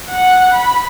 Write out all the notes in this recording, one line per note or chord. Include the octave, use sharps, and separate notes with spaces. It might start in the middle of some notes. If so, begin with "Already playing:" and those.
F#5
B5